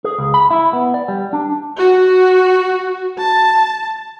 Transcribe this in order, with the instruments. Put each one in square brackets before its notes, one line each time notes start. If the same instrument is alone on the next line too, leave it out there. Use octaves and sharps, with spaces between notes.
[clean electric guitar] G#4
C#2
B5
E4
B3
D5
G3
D4
[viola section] F#4
A5